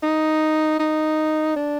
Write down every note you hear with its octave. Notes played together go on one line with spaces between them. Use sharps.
D#4
D#4
D4